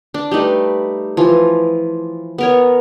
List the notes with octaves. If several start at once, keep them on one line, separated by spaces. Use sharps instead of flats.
D4
G3 A3 D#4 B4
E3 F3
B3 A#4 C#5